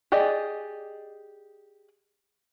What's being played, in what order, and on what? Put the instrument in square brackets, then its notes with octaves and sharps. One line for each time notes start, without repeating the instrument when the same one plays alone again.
[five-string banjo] G4 G#4 D5 D#5